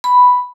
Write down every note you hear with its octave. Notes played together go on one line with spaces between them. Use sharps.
B5